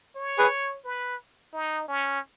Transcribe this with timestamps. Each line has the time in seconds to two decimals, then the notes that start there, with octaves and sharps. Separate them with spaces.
0.16 C#5
0.39 G#4 B4
0.85 B4
1.53 D#4
1.88 C#4